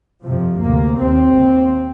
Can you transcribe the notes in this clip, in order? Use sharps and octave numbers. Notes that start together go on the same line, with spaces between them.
F2 C3 F3
D2 C3 A#3
D#2 C4
D#2